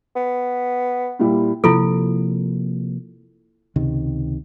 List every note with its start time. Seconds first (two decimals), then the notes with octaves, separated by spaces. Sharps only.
0.16 B3
1.19 A#2 G3 E4
1.64 C3 F3 A#3 E4 F4 A4
3.76 C#2 C3 D#3